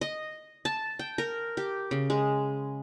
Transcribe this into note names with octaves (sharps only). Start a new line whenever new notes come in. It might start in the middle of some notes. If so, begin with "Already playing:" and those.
D#5
A5
G5
A#4
G4
C#3
G#3